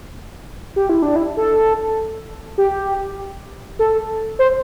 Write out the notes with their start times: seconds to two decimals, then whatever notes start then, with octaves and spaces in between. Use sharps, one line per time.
0.76 G4
0.89 E4
1.02 D4
1.16 E4
1.37 A4
2.58 G4
3.79 A4
4.39 C5